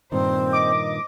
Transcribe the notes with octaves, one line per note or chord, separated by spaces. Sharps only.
G2 A#2 D#3 C4 C5
D#5 D6